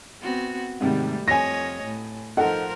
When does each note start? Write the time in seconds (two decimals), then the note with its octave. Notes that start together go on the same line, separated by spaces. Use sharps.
0.22 B3 C4 F#4
0.81 G#2 C3 D#3 G3 A3
1.28 F2 C#5 D#5 G#5 A#6
1.83 A2
2.37 F3 D#4 A4 A#4 C5 F#5